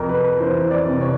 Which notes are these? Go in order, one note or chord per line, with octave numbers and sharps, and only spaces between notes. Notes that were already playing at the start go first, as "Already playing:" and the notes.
Already playing: F2 C3 A#4
B4
E3 C5
D5
C3
C#5